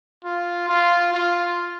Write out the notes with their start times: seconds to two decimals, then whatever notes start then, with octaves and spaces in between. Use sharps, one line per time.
0.24 F4
0.68 F4
1.14 F4